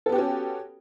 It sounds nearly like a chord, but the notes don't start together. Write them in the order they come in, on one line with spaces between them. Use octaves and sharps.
A4 B3 G4 F#4 C#4